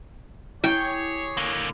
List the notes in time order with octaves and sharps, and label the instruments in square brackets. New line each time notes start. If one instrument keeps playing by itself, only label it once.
[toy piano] E4 [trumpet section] G4 G#4 C#5 [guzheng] G5
[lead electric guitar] D3 A#3